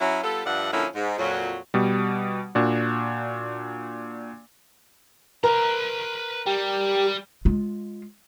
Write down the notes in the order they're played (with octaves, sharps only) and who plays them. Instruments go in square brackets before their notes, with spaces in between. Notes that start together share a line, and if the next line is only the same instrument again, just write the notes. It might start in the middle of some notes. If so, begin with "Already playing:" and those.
[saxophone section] F#3 C#4 E4
G3 B3 F4 A4
G2 F3 D5 E5 F#5
D3 F3 A#3 C#4 D#4 E4
G#2
F2 A#2 F#3
[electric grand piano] B2 G3
A#2 D4 F#4
[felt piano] A#4 [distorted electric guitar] B4 A#5
[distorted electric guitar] G3 [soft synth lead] G4
[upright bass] G#3 F4